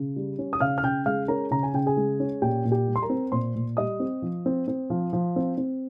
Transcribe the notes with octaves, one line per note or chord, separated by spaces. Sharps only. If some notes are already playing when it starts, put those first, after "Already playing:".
Already playing: C#3
G3
C#4
D#6
C#3 F5 F6
F6
C#3 G5 G6
G#3 F5 F6
C#4 A#4 A#5
C#3 A#5
G#5
C#3 G5
G#4 G#5
G#3
C#4
A#2 G4 G5
A#2
G4 G5
G3
C6
A#4 A#5
C4
A#2 C5 C6
A#2
G3 D#5 D#6
C4
F3
C4
C4
F3
F3
C4
C4